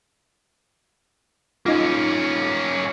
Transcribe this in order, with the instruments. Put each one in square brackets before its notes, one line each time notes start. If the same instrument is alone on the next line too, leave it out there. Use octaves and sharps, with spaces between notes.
[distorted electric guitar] A#3 C#4 [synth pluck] D#4 F4